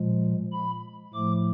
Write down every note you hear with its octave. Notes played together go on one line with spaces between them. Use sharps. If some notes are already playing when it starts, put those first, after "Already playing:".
Already playing: A#2 F3 G#3
B5
A2 F3 A3 D6